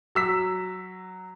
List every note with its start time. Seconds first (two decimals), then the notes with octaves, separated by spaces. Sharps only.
0.15 F#3 E6 B6